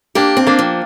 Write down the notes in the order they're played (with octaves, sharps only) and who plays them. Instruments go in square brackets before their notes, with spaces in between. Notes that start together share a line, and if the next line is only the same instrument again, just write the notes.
[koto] A#3 D4 [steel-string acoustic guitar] G4
[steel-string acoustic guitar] C4
[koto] A#3 D4
[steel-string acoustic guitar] F3